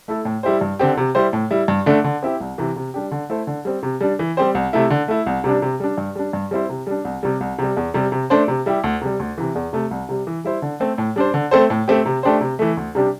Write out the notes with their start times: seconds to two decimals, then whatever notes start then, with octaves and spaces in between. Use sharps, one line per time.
0.08 A3 E4 A4
0.25 A2
0.43 G3 E4 G4 C5
0.61 G2
0.79 D3 C4 G4
0.97 C3
1.15 G3 E4 G4 C5
1.33 A2
1.51 G3 E4
1.68 G2
1.86 D3 A3 D4
2.04 D3
2.23 C4 E4 G4
2.40 C2
2.58 C3 E3
2.76 C3
2.94 G3 D4 G4
3.11 D3
3.30 A3 E4 A4 C5
3.47 D3
3.65 G3 C4
3.83 C3
4.01 G3 D4
4.19 E3
4.37 G3 C4 G4 C5
4.55 C2
4.73 C3 A3 E4
4.90 D3
5.08 A3 E4
5.26 C2
5.44 C3 G3 D4
5.62 C3
5.80 G3 D4
5.98 G2
6.15 G3 D4
6.33 G2
6.51 G3 C4 E4 C5
6.69 C3
6.87 G3 D4
7.05 C2
7.23 C3 G3
7.41 C2
7.59 C3 G3
7.77 E2
7.94 C3 G3
8.12 C3
8.30 A3 D4 C5
8.48 C3
8.66 G3 E4 G4
8.84 D2
9.02 C3 G3
9.20 D2
9.38 C3 E3
9.55 E2
9.73 C3 A3
9.91 C2
10.09 C3 G3
10.27 E3
10.45 G3 E4 C5
10.62 D3
10.80 A3 C4
10.98 A2
11.16 G3 D4 C5
11.34 D3
11.51 A3 C4 A4 C5
11.70 A2
11.88 A3 C4 G4
12.06 C3
12.23 A3 D4 G4 C5
12.41 C3
12.59 E3 A3
12.77 D2
12.95 C3 G3 D4 G4